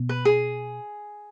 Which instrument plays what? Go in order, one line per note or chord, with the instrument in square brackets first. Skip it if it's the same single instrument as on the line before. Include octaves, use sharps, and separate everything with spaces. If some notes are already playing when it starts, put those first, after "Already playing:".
Already playing: [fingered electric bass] B2 B3
[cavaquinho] B4
G#4